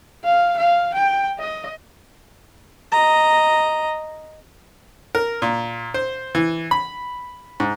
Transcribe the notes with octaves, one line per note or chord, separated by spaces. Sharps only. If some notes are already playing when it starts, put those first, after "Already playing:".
F5
F5
G5
D#5
D#5 A#5
A#4
A#2
C5
E3
B5
G#2